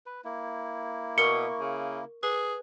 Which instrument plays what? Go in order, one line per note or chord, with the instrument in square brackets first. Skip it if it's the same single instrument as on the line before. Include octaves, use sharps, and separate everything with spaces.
[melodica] B4
A#3 E4
[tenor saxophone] B2 [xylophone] A#4 [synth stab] C#6
[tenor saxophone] C#3
[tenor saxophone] G#4 [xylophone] B4